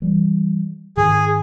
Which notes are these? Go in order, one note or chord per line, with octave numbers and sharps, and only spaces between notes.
E3 G3
G#2 D#3 G#4